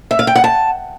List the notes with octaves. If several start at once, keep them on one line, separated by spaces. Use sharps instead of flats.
E5
F5
G5
F#5
A5